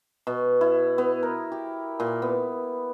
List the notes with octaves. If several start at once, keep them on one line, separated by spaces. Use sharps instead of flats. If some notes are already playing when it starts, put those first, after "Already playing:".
B2
E4
B3
A#4
G4
A#2
B3